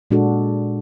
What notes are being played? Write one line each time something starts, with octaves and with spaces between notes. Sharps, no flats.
A#2 G#3 D4 F#4 A4